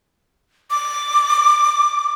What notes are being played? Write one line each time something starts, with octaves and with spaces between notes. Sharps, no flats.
D6